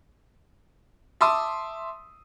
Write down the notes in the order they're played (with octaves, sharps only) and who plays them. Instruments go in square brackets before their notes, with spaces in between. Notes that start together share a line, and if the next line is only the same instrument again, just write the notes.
[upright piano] E5 A5 C6 D6 D#6